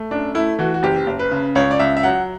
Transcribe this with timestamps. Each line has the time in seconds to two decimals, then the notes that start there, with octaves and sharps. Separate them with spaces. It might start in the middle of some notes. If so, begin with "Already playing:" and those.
Already playing: A3
0.11 F#2 D4
0.35 A3 E4
0.59 E3 F#4
0.74 F#4
0.83 F#1 G4
1.07 F#1
1.19 B4
1.31 C#3
1.55 C#2 C#5
1.71 D5
1.79 C#2 E5
1.97 E5
2.03 F#3 F#5